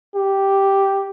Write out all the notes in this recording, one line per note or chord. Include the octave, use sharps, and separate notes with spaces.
G4